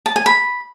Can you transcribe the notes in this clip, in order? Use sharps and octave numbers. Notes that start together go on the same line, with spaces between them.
A5
G#5
B5